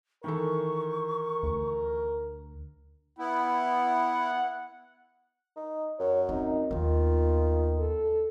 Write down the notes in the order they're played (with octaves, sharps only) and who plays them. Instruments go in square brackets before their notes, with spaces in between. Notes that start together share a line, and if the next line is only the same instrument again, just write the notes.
[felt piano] D#3 E3 A4 [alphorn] A#4 [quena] C#6
[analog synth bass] D2
[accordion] B3 E4 [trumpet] F#5
[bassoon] D#4
[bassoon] F#2 [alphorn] C#5
[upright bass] C4 [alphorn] D#4
[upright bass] D#2 B3 [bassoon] D#3 [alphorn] F4
[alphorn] A4